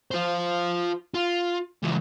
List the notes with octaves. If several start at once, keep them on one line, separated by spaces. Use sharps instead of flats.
F4 C5
F4
C#2 E3